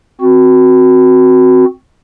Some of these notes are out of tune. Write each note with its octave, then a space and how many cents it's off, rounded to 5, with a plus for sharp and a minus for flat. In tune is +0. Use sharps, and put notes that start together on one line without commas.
C4 +0 F#4 +0